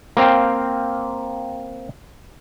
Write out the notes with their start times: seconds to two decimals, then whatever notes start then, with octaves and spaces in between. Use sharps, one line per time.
0.17 A#3 C4 F5 G5